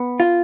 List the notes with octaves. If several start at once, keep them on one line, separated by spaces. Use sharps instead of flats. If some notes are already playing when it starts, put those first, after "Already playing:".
Already playing: B3
F4